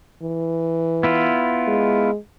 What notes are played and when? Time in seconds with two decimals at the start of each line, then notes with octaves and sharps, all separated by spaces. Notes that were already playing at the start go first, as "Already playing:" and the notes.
0.23 E3
1.03 B3 E4 F4
1.67 G#3